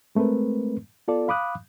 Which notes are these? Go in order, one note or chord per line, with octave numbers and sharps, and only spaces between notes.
G#3 A3 C4 A#4 B4
B3 F4 A4 D5
F5 B5 D6 D#6 F#6